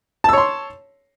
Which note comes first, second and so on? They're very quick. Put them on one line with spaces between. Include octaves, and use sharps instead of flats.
A5 E6 C#5 C6